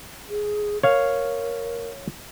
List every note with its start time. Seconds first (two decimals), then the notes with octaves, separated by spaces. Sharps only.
0.29 G#4
0.83 A#4 C#5 F5